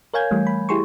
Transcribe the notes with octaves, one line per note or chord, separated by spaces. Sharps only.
A#4 C#5 F5 G#5 G6 G#6
E3 G3 A3
B5
E4 G4 G#4 C6 C#6